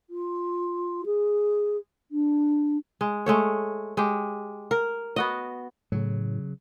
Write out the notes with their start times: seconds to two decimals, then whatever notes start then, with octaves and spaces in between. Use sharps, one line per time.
0.10 F4
1.06 G#4
2.11 D4
3.01 G#3
3.26 G#3 A3 C#5
3.97 G#3 G4
4.71 A#4
5.16 B3 F#4 D#5
5.92 A2 C#3 F#3